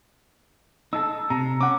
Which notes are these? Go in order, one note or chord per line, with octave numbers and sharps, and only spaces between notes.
D#4 E4 A4 A5 E6
C3 A5 A#5
C#4 F#5 D6